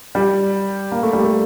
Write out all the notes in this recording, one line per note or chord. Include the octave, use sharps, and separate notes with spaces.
G3
A#3
A3
G3
A3